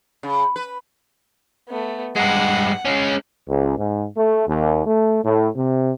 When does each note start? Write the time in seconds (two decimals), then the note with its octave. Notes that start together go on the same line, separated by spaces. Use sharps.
0.23 C#3
0.56 B4
1.68 A3 B3
2.16 G2 G#3 F#5
2.85 G#3 C#4
3.48 C#2
3.78 G#2
4.17 A3
4.47 D#2
4.85 A3
5.24 A2
5.56 C3